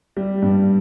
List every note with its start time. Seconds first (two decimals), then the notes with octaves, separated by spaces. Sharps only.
0.17 G3
0.42 G2